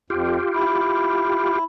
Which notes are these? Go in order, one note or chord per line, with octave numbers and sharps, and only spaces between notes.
F2 F4 G4
E4